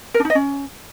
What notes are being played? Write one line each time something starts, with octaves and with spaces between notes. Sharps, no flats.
A#4
D4
D#4
D#5
C#4